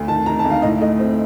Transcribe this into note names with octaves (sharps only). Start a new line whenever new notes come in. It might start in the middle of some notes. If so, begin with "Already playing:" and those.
Already playing: D2
D#3 A5
D#3 A#5
A5
D2
F5
A2 D#5
A3 D#5
C4